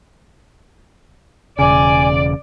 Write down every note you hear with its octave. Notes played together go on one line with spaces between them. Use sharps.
E1 C#3 D5 G#5